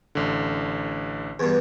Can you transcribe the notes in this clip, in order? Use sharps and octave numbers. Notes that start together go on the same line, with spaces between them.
A1 D3
E2 G2